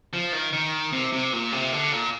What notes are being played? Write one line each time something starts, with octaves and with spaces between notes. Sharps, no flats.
F3
D#3
D#3
C3
C3
A#2
C3
D3
A#2